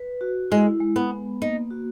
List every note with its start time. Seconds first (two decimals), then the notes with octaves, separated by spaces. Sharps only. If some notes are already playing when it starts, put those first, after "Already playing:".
Already playing: B4
0.21 F#4
0.51 G#3 E4
0.80 G#3
0.96 B3
1.11 B3
1.42 A#3 D#4
1.70 F#4